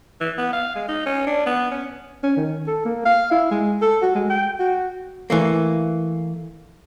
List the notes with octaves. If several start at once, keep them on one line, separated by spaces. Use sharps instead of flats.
E3
B3
F5
G#3
D#4
C#4
D4
B3
C#4
C#4
D#3
A4
A#3
F5
E4
G#3
A4
F#4
G#3
G5
F#4
E3 A3 A#3